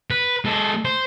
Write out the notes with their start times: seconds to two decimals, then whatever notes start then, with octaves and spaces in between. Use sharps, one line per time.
0.11 B4
0.45 G#3 A4
0.85 C5